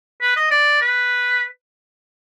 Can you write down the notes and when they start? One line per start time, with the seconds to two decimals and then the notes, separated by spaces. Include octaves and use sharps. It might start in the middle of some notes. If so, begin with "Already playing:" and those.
0.21 B4
0.36 D#5
0.51 D5
0.81 B4